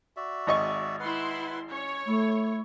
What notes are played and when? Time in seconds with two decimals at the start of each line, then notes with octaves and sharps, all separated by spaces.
0.17 F#4 D5 E5
0.47 G#1 D#5 C#6
1.00 E4 B4 F#5 C6
1.71 C#4 C#5
2.07 A3 E4